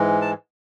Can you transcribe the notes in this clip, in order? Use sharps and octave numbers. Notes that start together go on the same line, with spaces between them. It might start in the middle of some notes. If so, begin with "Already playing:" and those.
Already playing: G#2 E3 G#3
A5